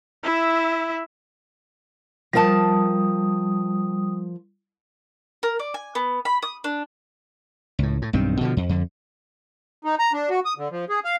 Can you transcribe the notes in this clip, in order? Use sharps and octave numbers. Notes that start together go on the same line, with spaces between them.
E4 E5
F3 G3 A#4 A5 D#6
A#4
D5
G#5
B3
B5
D#6
D4
C#2 A2
A2
B1 G2 D#3 C4
B2 D3 F3
F2
F2 D3
D#4
A#5
D4
F#4
D#6
D3
F3
G#4
F5